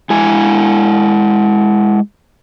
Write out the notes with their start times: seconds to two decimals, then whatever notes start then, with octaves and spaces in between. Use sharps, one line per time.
0.10 G#3 E4 G#5